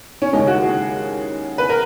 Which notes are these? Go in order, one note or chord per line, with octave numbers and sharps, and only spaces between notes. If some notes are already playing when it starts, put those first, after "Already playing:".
C#4
D#2 C#3 G#3 D#4
F#4
G#4
B4
A#4